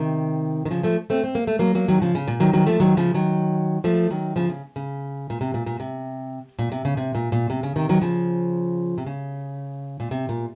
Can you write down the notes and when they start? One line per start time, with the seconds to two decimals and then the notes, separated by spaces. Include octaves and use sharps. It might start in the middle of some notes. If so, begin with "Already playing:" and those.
Already playing: C3 D#3
0.65 D#3
0.71 C#3 F3
0.83 F3 A3
1.10 A3 C4
1.24 C4
1.35 A#3
1.47 A3
1.59 F#3 A#3
1.75 F#3 A#3
1.88 D#3 F#3
2.02 C#3 F3
2.15 C#3
2.28 A#2
2.40 D#3 F#3
2.53 D#3 F#3
2.67 F3 A3
2.80 D#3 F#3
2.97 C#3 F3
3.14 D#3 F#3
3.84 F3 A3
4.10 D#3 F#3
4.36 C#3 F3
4.49 C#3
4.76 C#3
5.30 A#2
5.41 C3
5.54 A#2
5.66 A#2
5.80 C3
6.59 A#2
6.72 C3
6.85 C#3
6.97 C3
7.15 A#2
7.32 A#2
7.50 C3
7.63 C#3
7.76 C3 D#3
7.89 D#3 F#3
8.02 C#3 F3
8.98 C3
9.06 C#3
10.00 A#2
10.11 C3
10.29 A#2